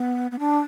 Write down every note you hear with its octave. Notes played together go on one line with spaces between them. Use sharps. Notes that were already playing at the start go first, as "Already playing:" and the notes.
Already playing: B3
B3
D4